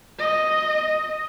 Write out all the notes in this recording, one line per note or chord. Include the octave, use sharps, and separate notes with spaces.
D#5